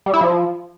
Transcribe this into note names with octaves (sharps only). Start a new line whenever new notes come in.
G3
E4
F3